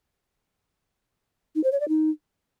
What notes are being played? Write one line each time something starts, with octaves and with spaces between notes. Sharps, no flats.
D#4
C5
C#5
D5
D#4